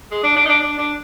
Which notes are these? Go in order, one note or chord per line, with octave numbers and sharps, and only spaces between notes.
G#3
D4
D4
D#4
D4
D4
D4